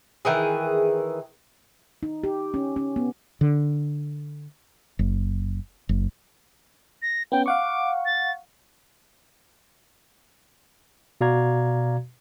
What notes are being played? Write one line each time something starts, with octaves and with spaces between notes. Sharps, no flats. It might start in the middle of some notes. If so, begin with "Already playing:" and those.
D#3 E3 G#4
D#4
G4
C#4
C#4
B3
D3
F#1
F#1
A#6
B3 C#4 G5
F5 F#5 C#6 D6
A6
B2 F#4 D5 F5 A#5 G#6